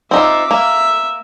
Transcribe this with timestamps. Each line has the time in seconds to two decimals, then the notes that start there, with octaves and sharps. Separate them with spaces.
0.11 C4 D#4 F4 E5 D6
0.51 A#3 E5